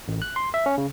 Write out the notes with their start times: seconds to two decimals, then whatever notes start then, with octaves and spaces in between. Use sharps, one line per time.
0.08 A1
0.22 F#6
0.36 C6
0.54 E5
0.66 C#4
0.78 C#3